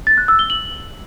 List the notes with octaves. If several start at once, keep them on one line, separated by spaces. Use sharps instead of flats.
A6
F#6
E6
G7
F#7